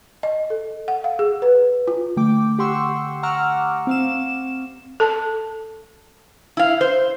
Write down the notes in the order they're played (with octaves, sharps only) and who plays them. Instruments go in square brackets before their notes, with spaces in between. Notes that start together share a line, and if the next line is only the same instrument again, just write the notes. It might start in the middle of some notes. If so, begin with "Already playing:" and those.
[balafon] D#5
A4
F#5
F5
G#4
B4
F4
[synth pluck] D3 A3 G5 D6
G4 F#5 G5 C6 C#6 E6
F#5 A#5 C#6 D6 E6 F6
C4 F5 E7
[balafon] A4 A5
[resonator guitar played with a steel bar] E4 F5
C5